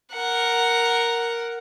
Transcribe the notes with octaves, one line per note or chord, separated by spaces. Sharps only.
A#4 F#5